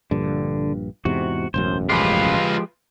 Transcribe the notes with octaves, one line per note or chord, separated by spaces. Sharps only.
A#1 G2 D3
E2 G#2 C3 F#4
E1 A1 F#2 C5
F3 G#3 F4 G4 B4